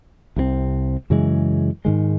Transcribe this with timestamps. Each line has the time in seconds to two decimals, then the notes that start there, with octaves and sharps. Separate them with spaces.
0.36 C2 C3 F#3 C4
1.10 F#2 C#3 E3 G#3
1.85 G#2 D#3 G#3